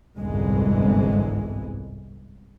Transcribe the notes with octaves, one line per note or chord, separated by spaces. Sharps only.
G1 C2 F2 G#2 E3 G#3